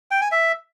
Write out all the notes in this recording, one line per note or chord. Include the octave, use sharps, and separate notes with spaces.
G5
G#5
E5